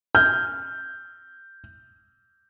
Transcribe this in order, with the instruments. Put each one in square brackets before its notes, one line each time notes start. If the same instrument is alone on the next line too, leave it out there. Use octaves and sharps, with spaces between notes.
[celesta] F6 [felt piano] G6